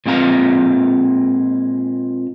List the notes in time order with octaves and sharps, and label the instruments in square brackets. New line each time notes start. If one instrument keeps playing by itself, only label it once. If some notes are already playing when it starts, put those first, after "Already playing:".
[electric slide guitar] A#2 G#3 C4 F5 A5 A#5